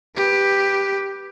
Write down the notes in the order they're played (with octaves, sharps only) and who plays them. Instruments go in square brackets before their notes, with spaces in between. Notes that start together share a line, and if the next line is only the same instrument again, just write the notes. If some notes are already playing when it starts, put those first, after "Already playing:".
[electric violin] G4 B4